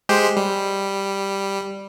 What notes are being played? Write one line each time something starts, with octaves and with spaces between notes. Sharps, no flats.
G#3 G4 C5
G3